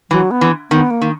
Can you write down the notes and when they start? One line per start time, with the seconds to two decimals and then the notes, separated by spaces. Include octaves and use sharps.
0.10 E3 F#3
0.31 B3
0.41 E3
0.71 D#3 B3
0.91 A#3
1.01 D#3